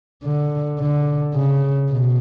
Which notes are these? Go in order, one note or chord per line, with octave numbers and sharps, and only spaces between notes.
D3
D3
C#3
B2